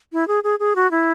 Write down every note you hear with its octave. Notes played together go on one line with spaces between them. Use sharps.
E4
G#4
G#4
G#4
F#4
E4